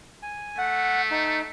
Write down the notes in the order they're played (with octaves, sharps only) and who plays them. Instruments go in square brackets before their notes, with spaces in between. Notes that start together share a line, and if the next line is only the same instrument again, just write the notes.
[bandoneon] G#5
[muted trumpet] A3 [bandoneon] F#5
[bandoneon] D#4